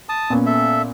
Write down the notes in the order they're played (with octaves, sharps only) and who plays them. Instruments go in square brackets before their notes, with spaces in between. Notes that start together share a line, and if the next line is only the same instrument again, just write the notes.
[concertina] A5 D#6
[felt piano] A#2 B3 C#4
[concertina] A4 E5